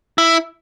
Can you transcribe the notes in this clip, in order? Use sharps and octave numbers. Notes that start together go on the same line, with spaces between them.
E4